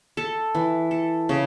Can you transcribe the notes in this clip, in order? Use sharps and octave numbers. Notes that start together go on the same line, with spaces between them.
A4
E3
A4
C#3